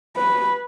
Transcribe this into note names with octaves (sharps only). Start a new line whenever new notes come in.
B4